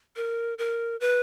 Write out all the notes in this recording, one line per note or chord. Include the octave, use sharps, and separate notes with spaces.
A#4
A#4
B4